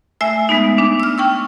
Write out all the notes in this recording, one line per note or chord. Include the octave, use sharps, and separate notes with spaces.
A3 E5 G#5 E6
G#3 B3 D#4
D4
E6 F6
G5 C#6 E6